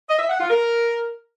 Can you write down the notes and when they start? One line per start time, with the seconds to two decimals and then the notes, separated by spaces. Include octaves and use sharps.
0.08 D#5
0.19 E5
0.29 F#5
0.40 F4
0.50 A#4